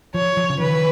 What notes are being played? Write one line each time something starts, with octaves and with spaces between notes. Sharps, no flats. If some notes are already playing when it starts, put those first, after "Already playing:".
F3 C#5
F3
C#3
D#3 B4